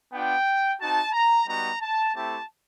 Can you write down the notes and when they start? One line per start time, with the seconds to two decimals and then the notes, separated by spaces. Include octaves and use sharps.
0.12 B3 D4 F4 G5
0.79 C4 D#4 F#4 A5
1.13 A#5
1.47 G3 B3 D#4 F#4 A#5
1.81 A5
2.15 A3 C4 E4 G4 A5